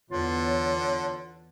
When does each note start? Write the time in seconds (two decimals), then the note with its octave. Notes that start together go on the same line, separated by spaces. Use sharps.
0.11 E2 D3 B3 F4 C#5